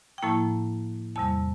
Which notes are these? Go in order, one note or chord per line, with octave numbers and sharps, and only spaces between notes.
G5
A2 F3 A#3 E4 A5
E2 C3 G3 A5